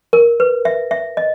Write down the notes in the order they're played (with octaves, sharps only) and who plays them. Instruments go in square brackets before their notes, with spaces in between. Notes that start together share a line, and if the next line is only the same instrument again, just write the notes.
[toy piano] A#4
B4
E5
E5
D#5